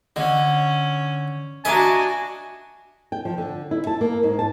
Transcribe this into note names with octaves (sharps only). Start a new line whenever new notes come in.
D3 C#4 D#5
D4 F#4 D#5 E5 G#5 A#5
G5
F3
D3
E4
A5
A#3
G#2
A5